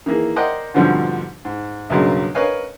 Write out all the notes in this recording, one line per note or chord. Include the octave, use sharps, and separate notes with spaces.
D#3 E3 A#3 G#4
A#4 C5 D5 D#5 F#5 G5
G#2 B2 D3 F3 G3 C4
G#2
B1 G2 C#3 F#3 G#3 A#3
A#4 B4 C#5 D#5 F5 G#5